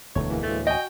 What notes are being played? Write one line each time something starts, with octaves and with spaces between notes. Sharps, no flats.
E1 D2 E3 A3 C#5
E3 G#3 A#3
D2 A2 A3
F#4 D#5 G5 G#5